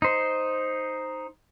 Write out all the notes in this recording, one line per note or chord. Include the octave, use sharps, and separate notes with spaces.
D#4 C5